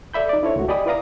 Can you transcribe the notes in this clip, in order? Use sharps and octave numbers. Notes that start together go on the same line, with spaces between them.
A4 D5 E5 B5 G6
D#4 D5
D4 E4 A4 C5 C#5
C#2 A3 F#4
G4 D5 D#5 G#5 B5 D#6
E4 B4 D5 F5 A#5 D#6